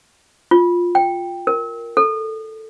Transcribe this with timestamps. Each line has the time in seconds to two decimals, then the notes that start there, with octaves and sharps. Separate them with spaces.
0.51 F4
0.95 G5
1.47 A#4
1.97 A4